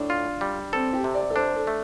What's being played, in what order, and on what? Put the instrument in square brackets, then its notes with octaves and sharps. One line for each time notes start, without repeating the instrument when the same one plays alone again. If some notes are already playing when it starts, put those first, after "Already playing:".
Already playing: [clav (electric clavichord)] A2 [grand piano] D4
[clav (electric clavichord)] F4
G3
[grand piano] C4 [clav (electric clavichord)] A4
[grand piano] G4
[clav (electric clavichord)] C3
[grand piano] D5
A4
[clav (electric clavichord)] D4 [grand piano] C5
[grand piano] A4
[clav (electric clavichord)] A3